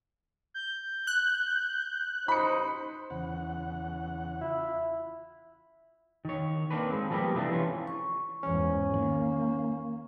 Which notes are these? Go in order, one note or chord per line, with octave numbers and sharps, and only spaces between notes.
G6
F#6
A1 D#4 C5 B5 C#7
E2 C#3 F#5
E4 F4
D#3 C#5
A#3 C4 D4 B4
G#3 C4
F3 G3 A#3 B3 G4
C3 E3 A3 D4
E3 C#4 F4
C#6
E2 G#2 C#4
D#3 A#3